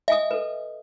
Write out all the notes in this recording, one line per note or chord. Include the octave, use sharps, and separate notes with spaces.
D#5 E5 G#5 D#6
A4 B4